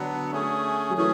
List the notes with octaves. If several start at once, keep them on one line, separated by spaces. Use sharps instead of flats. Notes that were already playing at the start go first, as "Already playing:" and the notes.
Already playing: D3 F#3 B3 D4
A3 C#4 G#4
F#3
E3 A3 C#4 G#4